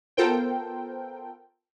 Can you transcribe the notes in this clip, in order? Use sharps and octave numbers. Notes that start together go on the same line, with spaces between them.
B3 F4 A4 A#4 C5 G5